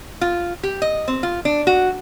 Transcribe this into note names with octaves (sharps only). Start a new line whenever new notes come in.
F4
G4
D#5
C4
F4
D4
F#4